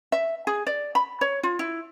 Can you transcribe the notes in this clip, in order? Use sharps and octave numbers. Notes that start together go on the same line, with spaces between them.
E5
G#4
D5
B5
C#5
F4
E4